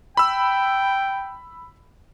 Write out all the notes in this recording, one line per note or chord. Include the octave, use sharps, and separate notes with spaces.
G5 B5 E6